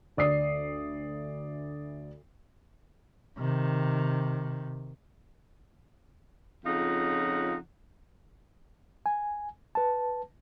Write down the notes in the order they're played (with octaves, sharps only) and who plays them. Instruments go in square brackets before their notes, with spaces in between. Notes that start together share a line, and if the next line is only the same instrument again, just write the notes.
[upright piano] D2 D5 D#6 C7
[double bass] C3 D#3
[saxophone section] F2 C#3 D#4 F4 F#5
[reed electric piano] G#5
B4 A5